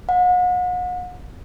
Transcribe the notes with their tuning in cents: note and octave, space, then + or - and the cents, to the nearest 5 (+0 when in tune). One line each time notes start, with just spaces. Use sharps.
F#5 -40